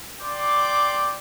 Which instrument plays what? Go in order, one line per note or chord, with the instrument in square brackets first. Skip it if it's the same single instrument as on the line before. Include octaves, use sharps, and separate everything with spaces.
[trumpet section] D5 G5 C6 D6